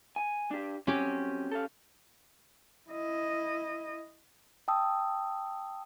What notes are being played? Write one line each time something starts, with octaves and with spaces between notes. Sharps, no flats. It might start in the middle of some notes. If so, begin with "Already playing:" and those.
G#5
D4 G4
F#3 C4 C#4 G4
A4 F5
E4 D#5
G5 A5 D#6 E6